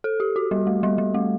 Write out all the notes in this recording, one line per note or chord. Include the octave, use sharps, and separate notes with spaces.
A4
G4
F#4
G3
A3
G3
G3
A3